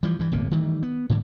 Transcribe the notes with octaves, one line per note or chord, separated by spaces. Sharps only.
E3 F3 G3
G2 E3
D1 G1 C3 A#3
D#3 E3 G3 A3
B3
G#2 D3 E3 G3